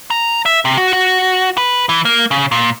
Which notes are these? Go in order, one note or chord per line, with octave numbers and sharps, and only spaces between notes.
A#5
E5
C3
F#4
F#4
B4
E3
A#3
C#3
A#2